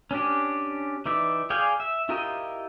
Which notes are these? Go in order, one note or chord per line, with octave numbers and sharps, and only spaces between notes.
C#4 D4 G4
E3 D#4 D5 E5
G#4 D5 F5 G5 G#5
E5
E4 F4 G4 A#4 D#5